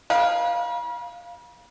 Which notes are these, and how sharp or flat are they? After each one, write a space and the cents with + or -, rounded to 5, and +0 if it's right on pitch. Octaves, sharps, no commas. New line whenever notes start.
B4 -40 F5 +0